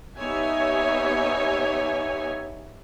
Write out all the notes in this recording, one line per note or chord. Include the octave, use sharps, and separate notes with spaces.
B3 D#4 G4 C#5 E5 G#5